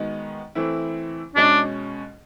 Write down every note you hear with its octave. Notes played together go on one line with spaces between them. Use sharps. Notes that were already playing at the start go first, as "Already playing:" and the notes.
Already playing: D#3 G#3 B3 D#4 F#4
E3 A3 C4 E4
B2 G#3 C#4 D4